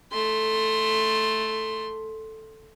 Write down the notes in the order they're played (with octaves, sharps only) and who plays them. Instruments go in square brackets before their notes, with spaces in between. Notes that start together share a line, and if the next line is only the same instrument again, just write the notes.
[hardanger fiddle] A3 C6